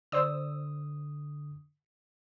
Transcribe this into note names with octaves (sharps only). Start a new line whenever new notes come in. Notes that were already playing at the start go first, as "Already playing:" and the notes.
D3 C5 D5 D#6 E6